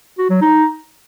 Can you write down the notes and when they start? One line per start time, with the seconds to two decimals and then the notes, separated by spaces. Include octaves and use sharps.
0.18 F#4
0.30 F#3
0.41 D#4